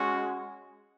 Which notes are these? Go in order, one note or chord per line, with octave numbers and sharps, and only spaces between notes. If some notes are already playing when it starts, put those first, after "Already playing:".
Already playing: G#3 C#4 F#4